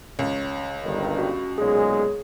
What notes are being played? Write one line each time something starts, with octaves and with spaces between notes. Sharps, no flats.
C#2 C#5
G1 G2 D#3
F#4
B1 A#2 G#3 G#4 C#5